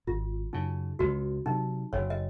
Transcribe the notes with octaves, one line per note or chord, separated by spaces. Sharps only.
G#1 F4
F#2 C#3 D#4
C#2 F#4
C3 F#3 D#4
F#1 C#5
D#5